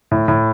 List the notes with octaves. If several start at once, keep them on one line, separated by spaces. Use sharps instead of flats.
A2
A2